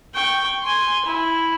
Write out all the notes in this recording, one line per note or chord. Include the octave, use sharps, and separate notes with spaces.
G5 C#6
G#5 C6
E4